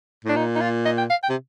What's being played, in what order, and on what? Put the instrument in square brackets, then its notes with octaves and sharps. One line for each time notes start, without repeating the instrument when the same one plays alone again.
[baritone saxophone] A2 [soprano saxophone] D4
[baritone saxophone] A#2 [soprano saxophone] D#4
[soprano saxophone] D#4
F4
D#5
G5
F5
G5
[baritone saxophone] C3